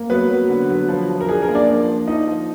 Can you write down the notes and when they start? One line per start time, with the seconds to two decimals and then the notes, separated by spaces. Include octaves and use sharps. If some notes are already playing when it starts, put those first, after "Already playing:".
Already playing: A#3
0.10 F#3 B3 B4
0.30 F#3
0.49 D3
0.70 F#3
0.88 F3
1.09 F3
1.21 A#4
1.29 D4 G#4
1.42 A#4
1.49 A#3
1.55 D4 D5
1.68 F3
1.88 F3
2.07 F3 D#4 D#5
2.27 F3